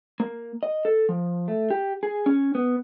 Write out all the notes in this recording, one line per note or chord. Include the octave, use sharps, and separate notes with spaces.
A#3
D#5
A4
F3
A3
G4
G#4
C#4
B3